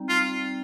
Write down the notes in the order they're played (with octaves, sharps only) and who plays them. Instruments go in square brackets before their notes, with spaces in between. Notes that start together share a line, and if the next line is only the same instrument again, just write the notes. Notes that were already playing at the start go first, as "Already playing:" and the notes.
Already playing: [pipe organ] G3 C4 D#4
[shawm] F4